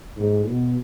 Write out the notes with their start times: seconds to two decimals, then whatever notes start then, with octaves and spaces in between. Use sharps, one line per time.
0.17 G#2
0.47 B2